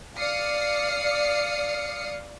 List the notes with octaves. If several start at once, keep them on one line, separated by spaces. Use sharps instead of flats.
D5 F5 D#6 F6 C7 C#7